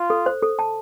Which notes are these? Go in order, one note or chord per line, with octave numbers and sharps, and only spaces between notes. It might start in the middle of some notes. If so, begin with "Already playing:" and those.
Already playing: F4
A4
C5
A4
A5